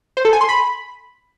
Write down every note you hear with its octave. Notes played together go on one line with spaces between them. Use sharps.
C5
A4
G#5
C6
B5